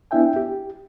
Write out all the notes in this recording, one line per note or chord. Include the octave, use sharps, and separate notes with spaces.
B3 D4 E4 E5 G5 G#5
G4